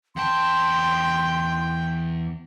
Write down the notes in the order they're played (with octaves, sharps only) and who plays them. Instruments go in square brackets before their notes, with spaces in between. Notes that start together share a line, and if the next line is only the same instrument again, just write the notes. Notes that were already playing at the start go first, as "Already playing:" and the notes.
[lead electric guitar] E2 A5 [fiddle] G5 [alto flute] C6